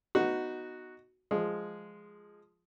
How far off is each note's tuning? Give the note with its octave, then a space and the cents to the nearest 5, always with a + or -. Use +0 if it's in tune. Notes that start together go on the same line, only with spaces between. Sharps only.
B3 +10 D#4 +0 F#4 +0
F3 +0 G#3 +0